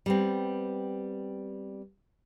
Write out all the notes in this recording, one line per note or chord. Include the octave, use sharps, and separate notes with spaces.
G3 B3 C4